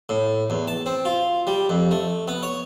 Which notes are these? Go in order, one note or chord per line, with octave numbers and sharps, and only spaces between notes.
A2
E2
A5
C4
F4
G3
F2
A3
B3
C#5